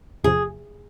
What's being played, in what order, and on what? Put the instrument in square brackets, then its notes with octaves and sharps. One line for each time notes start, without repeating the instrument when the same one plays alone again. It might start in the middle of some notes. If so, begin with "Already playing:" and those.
[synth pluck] E2 C3 F3 [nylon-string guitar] G#4